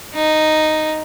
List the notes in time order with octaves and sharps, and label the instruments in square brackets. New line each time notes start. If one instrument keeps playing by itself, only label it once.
[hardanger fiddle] D#4